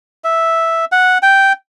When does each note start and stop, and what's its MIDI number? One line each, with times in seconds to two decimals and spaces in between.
0.24 0.85 76
0.92 1.18 78
1.22 1.53 79